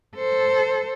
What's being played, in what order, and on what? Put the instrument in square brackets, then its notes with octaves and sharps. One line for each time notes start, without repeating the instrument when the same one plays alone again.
[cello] A4 C5